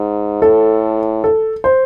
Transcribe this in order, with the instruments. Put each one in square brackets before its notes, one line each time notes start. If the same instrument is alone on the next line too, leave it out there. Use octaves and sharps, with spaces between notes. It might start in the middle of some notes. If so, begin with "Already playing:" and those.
Already playing: [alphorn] G#2
[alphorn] A2 [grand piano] A4
[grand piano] A4
C5